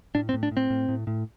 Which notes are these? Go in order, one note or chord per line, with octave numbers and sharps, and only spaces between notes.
A2 D4
C4
A2
D4
A2
C4
A2
A2
A2